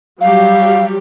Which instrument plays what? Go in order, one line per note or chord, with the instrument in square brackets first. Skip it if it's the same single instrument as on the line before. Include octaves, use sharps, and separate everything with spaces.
[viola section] F#3 G3 G4 [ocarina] F5